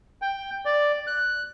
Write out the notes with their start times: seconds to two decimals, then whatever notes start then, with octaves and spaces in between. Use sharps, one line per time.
0.22 G5
0.65 D5
1.07 F#6